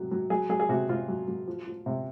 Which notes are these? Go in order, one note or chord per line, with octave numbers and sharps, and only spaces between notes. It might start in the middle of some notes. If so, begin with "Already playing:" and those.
Already playing: C3 F#3
F#3
F#3 G#4
F#3 G#4
G#4
C3 F#4
C3 F4
F#3
F#3
F3
F3
C3